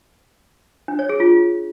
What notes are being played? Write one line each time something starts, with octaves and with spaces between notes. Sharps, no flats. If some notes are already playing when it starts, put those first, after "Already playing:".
D4
C#5
G#4
F4